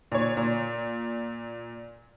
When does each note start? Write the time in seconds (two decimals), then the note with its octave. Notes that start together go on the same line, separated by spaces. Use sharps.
0.12 A#2 C#5
0.37 A#2